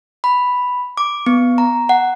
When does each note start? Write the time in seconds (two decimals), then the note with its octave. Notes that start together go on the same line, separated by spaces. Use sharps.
0.24 B5
0.97 D6
1.26 B3
1.58 A#5
1.89 F#5